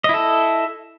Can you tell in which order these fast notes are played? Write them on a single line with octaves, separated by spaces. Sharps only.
D#5 E4 A4